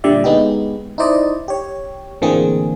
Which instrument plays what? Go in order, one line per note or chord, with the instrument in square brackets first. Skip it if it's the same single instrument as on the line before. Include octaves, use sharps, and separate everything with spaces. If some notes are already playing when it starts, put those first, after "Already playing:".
[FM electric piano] A#2 D3 G3 D5 E5
G#3 B3 D#4 G4
D#4 E4 C5 D5 D#5
G4 C#5
A2 D3 E3 A#3 C4 G#4